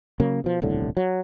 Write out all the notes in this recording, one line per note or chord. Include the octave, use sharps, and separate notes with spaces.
C#3 F#3 A#3
B2 F3
D#1 C2 A2 D3
F#3